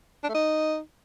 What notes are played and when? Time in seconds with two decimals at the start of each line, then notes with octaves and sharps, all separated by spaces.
0.24 D4
0.29 A3
0.34 D#4